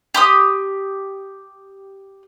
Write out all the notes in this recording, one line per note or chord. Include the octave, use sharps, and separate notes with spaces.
G4 C6 D#6